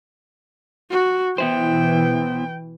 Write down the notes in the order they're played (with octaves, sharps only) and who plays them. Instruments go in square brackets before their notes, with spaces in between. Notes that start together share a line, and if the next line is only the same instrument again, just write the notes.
[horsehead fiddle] F#4
[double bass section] B2 E3 [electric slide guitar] B3 E4 C5 [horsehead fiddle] G5